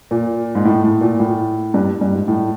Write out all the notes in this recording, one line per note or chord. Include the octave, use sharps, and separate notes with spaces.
A#2
G#2
A2
A2
A#2
A2
G2
G2
G#2
A2